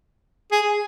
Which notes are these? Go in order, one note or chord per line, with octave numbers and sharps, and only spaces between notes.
G#4